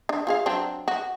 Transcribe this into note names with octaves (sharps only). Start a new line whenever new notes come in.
D4
F4 G#4 F5
F#3 C4 D4
F#4